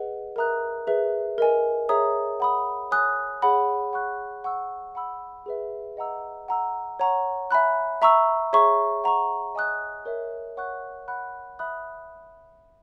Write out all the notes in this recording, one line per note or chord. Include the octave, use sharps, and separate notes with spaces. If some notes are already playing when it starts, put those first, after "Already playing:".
Already playing: G#4 B4 D#5 F#5
A#4 E5 A#5 D#6 F#6
G#4 B4 E5
A#4 D#5 G#5
G#4 C#5 E5 A#5 D#6
F#5 B5 D#6
C#5 G#5 D#6 F#6
G#4 C#5 F#5 B5
F#5 C#6 F#6
F#5 C#6 E6
F#5 B5 E6
G#4 B4 E5
D#5 F#5 A#5 E6
F#5 A#5 E6
C#5 F#5 A#5 C#6
E5 G#5 B5 F#6
E5 A#5 C#6 E6
G#4 C#5 E5 A#5 C#6
F#5 A#5 C#6
D#5 G#5 D#6 F#6
A#4 C#5 E5
C#5 F#5 C#6 F#6
F#5 B5 F#6
E5 B5 D#6 F#6